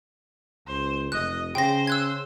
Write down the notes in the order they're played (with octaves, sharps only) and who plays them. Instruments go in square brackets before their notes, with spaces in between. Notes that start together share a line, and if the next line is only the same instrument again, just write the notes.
[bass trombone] C#2 [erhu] C5
[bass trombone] F1 [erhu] D#5 [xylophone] F#6
[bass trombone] C#3 [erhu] C5 [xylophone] G5 A#6
[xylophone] E6 F#6 G#6